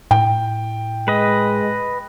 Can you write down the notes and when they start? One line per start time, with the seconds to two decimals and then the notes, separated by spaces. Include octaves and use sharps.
0.11 A2 G5
1.08 G#3 B4 D#5